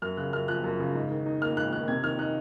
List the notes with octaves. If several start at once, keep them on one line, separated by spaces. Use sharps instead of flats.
F#2 F6
C#3 F#6
F#2 F6
F3 F#6
F#2
C#3
G#2
D#3
D#4
A#3 F6
G#2 F#6
D#3 F#6
C3 G#6
D#3 F6
D#4 F#6